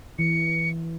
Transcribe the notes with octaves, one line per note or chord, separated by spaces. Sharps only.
E3 C#7